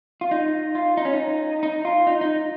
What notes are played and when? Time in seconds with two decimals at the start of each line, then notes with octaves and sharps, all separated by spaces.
0.21 F4
0.31 D#4
0.75 F4
0.97 D#4
1.05 C#4
1.13 D#4
1.63 D#4
1.85 F4
2.07 D#4
2.21 D#4